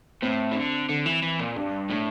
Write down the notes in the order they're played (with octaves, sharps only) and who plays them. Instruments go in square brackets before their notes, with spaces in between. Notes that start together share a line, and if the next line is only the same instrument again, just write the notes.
[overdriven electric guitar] A2 [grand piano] C4
[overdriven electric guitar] E3
D3
D3
E3
E3
A#2
[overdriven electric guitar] G2 [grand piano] D4
[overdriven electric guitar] A2 [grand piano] D4